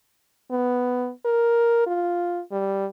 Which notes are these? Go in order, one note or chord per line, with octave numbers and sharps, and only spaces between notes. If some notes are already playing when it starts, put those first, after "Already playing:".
B3
A#4
F4
G3